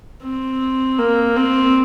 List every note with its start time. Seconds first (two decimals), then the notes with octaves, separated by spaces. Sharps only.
0.23 C4
0.99 A#3
1.36 C4